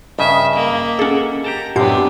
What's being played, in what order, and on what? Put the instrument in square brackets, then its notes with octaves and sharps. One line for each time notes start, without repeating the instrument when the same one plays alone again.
[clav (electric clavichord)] G2 C#3 G#5 [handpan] D#5 [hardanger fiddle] E5
[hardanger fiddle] A#3
[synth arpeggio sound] C#4 G#4 [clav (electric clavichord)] A4 F#5
[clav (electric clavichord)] G4 G5 A5 [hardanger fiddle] A#5
[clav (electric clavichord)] F#2 C3 [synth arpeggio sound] A2 G6 C7 [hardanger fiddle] B3 D4 [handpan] G4